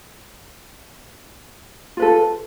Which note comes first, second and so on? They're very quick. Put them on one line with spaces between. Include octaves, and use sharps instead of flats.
F4 B4 A4